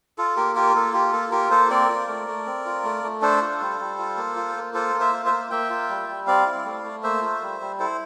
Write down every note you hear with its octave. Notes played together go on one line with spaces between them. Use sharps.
F4 A4
A#3 G4 A#4
F4 G4 A#4
A#3 A4
F4 G4
A#3 A4
F4 G4 A#4
A#3 A4 C5
C4 A#4 D5
F4
A3
A3
C4
F4
A3
A3
D4 A4 C5
F4
G3
G3
F4
A#3
F4
A#3
F4 A4 C5
A#3
C5 E5
F4
C5 E5
A#3
A#3 E5 G5
F4
G3
G3
C4 D5 F5
E4
A3
A3
A#3 C5 E5
F4
G3
G3
E4 A4 C5